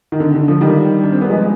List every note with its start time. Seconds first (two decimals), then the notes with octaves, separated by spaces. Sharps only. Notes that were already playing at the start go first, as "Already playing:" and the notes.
0.12 D#3
0.20 D3
0.35 D3
0.48 D3 F3
0.61 D#3 G3
1.04 D4
1.12 C4
1.21 B3
1.30 F3 G#3